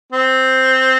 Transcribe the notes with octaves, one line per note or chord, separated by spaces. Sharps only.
C4